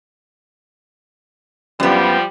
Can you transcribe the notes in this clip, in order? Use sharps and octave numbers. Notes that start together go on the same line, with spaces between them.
F#2 F3 G3 B3